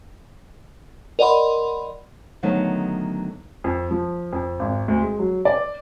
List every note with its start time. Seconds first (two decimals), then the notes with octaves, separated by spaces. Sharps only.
1.19 A#4 D5 D#5 F#5 B5 C6
2.43 D3 D#3 F#3 A3 B3 D#4
3.64 F2
3.91 F3
4.33 F2
4.59 G#1
4.88 D2
5.02 G#3
5.19 F#3
5.45 D5